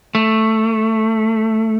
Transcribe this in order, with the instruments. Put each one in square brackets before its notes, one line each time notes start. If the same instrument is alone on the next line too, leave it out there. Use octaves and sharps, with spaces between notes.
[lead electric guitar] A3